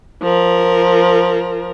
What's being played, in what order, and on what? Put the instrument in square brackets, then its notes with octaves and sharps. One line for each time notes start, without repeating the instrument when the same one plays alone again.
[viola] F3 A#4